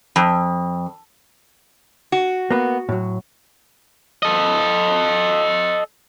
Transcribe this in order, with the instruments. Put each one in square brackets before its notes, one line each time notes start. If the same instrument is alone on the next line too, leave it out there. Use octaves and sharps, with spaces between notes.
[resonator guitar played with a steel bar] F2
F#4
[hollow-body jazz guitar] A#3 B3
A2 F#3
[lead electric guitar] A4 D#5